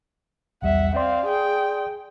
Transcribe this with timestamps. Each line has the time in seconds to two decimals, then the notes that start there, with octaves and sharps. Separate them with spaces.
0.62 B1 E2 G3 E5 F#5
0.96 C4 D5 F5 C6
1.26 G#4 G5